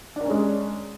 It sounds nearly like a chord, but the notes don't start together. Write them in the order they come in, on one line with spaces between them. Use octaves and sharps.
D4 A#4 C#4 G#3